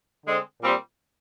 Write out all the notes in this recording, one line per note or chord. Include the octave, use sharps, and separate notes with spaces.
D3 G#3 C4
A#2 G3 C4